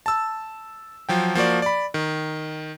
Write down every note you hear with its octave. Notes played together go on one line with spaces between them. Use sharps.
A5 E6
F3 F#3 G5
F3 A#3 F#4 D5
D5 B5
D#3